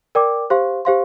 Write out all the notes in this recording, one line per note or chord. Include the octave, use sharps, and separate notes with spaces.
A#4 D5 G5 D6
G4 C5 F5 C6
G4 C5 F5 C6